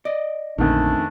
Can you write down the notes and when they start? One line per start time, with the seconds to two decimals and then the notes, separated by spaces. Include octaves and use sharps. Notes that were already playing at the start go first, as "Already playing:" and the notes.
0.05 D5 D#5
0.58 A#1 F2 D3 D#3 A3 C#4 D4